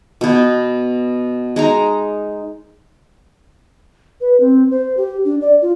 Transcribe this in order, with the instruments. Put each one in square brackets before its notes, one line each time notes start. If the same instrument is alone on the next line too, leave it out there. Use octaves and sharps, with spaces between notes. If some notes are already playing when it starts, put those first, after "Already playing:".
[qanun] B2 B3
G#3 D#4 A#5
[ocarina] B4
C4
C5
G4
D4
D5
F4